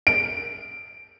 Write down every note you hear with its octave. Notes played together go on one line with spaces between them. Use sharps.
D7